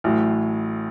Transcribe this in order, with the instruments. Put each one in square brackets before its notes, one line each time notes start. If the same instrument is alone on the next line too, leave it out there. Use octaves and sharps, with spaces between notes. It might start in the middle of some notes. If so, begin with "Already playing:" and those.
[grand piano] A1 A2 F#3